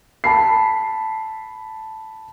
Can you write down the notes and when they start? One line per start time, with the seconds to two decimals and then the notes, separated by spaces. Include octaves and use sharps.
0.24 A5 B5 C7